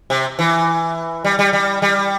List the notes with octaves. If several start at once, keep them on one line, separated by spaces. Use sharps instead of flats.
C3
E3
G3
G3
G3
G3